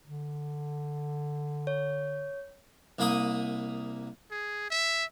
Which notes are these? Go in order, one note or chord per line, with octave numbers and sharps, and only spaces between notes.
D3
C#5
C2 A#3 B5 D#6
G#4
E5